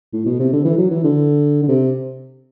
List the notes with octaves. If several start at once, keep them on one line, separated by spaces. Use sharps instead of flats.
A2
B2
C3
D3
E3
F#3
E3
D3
D3
C3